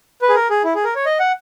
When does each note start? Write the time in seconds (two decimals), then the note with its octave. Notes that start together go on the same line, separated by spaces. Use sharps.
0.22 B4
0.29 G#4
0.35 A#4
0.50 G#4
0.64 E4
0.75 G#4
0.84 A#4
0.96 C#5
1.06 D#5
1.20 F#5